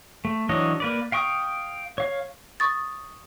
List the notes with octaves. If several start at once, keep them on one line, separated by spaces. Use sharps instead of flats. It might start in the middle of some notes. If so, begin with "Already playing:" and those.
A3
E3 F#3 D4 C#5 D#5
A#3 B4 D5
F5 G5 C#6 D#6
C#5 F5
C#6 D#6 A6